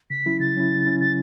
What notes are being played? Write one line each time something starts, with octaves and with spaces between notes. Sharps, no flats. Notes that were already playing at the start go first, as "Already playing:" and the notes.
C#3 B6
F#3 C#4 E4
C#3 A6
F#3 C#4 E4
C#3
F#3 C#4 E4
C#3 A6